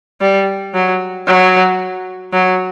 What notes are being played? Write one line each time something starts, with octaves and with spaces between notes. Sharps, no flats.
G3
F#3
F#3
F#3